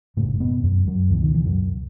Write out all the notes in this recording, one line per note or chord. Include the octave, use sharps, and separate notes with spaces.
F#1 E2 A2 C#3 A3
B2 B3
F#2 F#3
F#2 F#3
C#2 B2 E3
D#3
E3
F#2 F#3